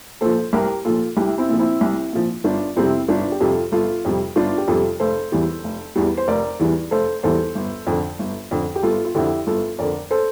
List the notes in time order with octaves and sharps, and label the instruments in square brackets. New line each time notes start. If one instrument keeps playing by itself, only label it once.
[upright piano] A#2 F3 A4 C5
C2 G4 A#4
A#2 F3 F4 A4
C2 E4 G4
C4 E4
A#2 F3
C4 E4
C2
A#2 F3
G1 D4 F4
F2 C3 G3 C4 E4
G1 D4 F4
G4
F2 C3 G3 F4 A4
G1 F4 A4
F2 C3 G3
G1 D4 F4
G4
F2 C3 G3 F4 A4
F1 A4 C5
E2 E3 G3
F1
E2 E3 G3
C5
F1 A#4 D5
E2 E3 G3
F1 A4 C5
E2 E3 G3 A4 C5
G1
F2 D3
G1
F2 D3
G4
G1 F4 A4
F4
F2 D3 E4 G4
G1 F4 A4
F2 D3 A#4 D5
A4 C5